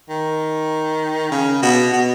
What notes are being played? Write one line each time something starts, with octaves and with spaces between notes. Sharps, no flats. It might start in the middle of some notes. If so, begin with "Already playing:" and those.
D#3
C#3
B2
B2